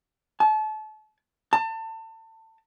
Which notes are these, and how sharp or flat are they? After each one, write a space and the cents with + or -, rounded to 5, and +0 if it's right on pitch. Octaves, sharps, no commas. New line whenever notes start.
A5 -35
A5 +30